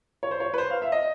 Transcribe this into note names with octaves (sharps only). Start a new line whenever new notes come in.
C#5
C5
C#5
B4
C5
F5
E5
D#5